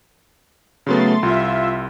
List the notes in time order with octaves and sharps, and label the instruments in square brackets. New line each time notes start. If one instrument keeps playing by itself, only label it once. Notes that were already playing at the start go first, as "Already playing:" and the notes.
[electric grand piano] C#3 F#3 B3 [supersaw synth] A3 C6 A6
[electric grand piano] C2 C6 [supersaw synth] F4 E5